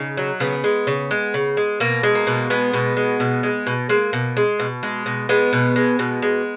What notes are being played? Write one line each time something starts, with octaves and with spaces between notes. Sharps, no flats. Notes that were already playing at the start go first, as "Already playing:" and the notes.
Already playing: C#3 D#4
F#3
C#3 B3
G#3
C#3
G#3
C#3
G#3
B2 A#3
G#3
A#3
B2
G#3 B3
B2
G#3
B2
G#3
B2
G#3 A#3
B2
G#3
B2
G#3
B2
G#3 B3
B2
G#3
B2
G#3